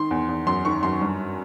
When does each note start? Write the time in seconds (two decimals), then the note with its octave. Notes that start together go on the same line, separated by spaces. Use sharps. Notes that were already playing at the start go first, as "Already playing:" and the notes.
Already playing: D#3 C6
0.11 E2
0.29 E2
0.46 F#2 C6
0.65 D#3 C#6
0.83 F#2 C6
1.01 G2